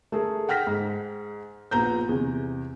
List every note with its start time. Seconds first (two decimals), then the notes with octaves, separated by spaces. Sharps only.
0.12 A3 G#4 A#4
0.49 F#5 G5 F6 A#6 B6
0.67 G#2
1.71 A#1 B3 A#5 G6
2.09 E2 C3